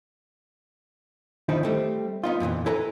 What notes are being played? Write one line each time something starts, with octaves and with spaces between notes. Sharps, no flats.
D#3 F3 D#4 E4
G3 A3 C4
B3 D#4 F4
F2 A#2 D#3 E3
E4 A4 B4 G#5 A#5